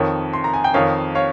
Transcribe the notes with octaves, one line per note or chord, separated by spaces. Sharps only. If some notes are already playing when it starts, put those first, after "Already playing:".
Already playing: F2 D#3 C#5
C6
A#5
G#5
G5
F2 D#3 C#5 F5
C#5 F5